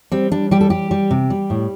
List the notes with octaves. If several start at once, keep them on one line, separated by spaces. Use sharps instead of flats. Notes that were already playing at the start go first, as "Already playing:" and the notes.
G3 C4
G3 D4
G3 G4
A4
G3 G4
G3
C3
G3
A2